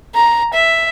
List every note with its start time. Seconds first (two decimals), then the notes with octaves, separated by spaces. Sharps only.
0.15 A#5
0.54 E5